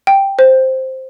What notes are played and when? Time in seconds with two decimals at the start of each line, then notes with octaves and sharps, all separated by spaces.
0.07 G5
0.39 C5